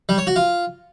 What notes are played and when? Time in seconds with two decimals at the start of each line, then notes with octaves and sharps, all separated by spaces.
0.09 G3
0.18 C#5
0.27 F#4
0.36 F4